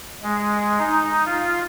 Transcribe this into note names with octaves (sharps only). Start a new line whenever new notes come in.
G#3
D#4
F4